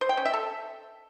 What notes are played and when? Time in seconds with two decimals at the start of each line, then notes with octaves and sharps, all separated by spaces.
0.01 C5
0.09 G5
0.17 C#4
0.25 E5
0.33 A4